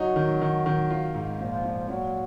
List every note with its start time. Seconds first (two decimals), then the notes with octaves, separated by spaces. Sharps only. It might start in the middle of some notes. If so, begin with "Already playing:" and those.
Already playing: F#3 D#4
0.16 D#3
0.42 D#3
0.66 D#3
0.90 F4
1.14 G#2
1.39 A#2 F3
1.64 A#2
1.89 A#2 F#3